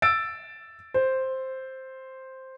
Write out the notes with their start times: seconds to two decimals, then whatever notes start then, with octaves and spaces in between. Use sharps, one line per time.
0.02 E6 A6 D7
0.94 C5